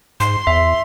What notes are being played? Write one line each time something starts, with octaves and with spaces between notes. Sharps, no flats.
G#2 C6
E2 E5